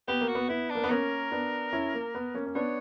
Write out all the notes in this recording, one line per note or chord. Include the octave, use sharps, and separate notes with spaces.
B3 G4
A#3
F#4
B3
B3 E4
D4
A#3
B3
A#3 C#4 A#4
B3 D4
C#4 E4
A#3
B3
A#3 C#4
C#4
B3 D4 C#5